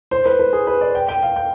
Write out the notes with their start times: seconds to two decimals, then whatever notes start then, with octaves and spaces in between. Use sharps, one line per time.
0.11 C5
0.26 B4
0.39 B4
0.53 G#4
0.67 B4
0.81 D5
0.95 G5
1.09 G5
1.23 F5
1.36 G5